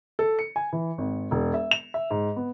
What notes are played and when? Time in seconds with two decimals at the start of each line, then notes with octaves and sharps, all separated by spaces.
0.19 A4
0.39 C#7
0.56 G#5
0.73 E3
0.98 G#1
1.31 E1
1.54 E5
1.71 F7
1.94 E5
2.11 G#2
2.36 B3